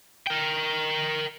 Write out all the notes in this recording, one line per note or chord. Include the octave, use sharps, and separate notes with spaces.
A#4 G5